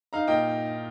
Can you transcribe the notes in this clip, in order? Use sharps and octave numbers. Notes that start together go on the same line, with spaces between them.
D#4 F5 A#5
A#2 D#5 G5